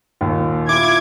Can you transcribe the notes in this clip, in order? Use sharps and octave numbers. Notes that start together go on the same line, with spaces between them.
D#2 A#2
E4 F4 D6 G#6